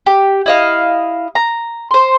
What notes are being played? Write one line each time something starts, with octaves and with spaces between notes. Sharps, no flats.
G4
E4 D#5 F5
A#5
C5 C6